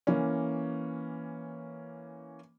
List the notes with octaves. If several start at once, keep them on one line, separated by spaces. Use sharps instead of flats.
E3 A#3 C#4